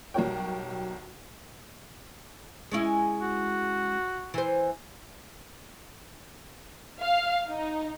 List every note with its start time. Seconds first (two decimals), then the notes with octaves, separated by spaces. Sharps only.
0.14 B1 G3 F#4 A#4 C#5 G5
2.71 G#3 C#4 E4
3.21 F#4
4.34 E3 C5
7.01 F5
7.47 D#4